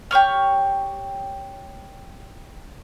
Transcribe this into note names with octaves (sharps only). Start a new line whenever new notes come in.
G4 C#5 C#6 F6